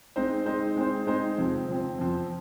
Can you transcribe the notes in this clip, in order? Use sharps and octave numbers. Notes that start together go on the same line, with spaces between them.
G#3 C4 D#4 C5
G#3 C4 D#4 C5
G#3 C4 D#4 C5
G#3 C4 D#4 C5
F2 F3 C4
F2 F3 C4
F2 F3 C4